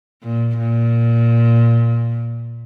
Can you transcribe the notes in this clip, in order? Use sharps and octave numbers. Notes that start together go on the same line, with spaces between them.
A#2
A#2